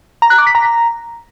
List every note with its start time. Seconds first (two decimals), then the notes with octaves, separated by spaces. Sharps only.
0.22 A#5
0.30 F#6
0.38 D6
0.47 B6
0.55 A#5